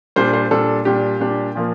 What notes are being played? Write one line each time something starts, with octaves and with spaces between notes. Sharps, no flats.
A#2 G3 D4 C5
C5
A#2 G3 D4 A4
A#2 G3 D4 G4
A#2 G3 D4
A#2 F3 A#3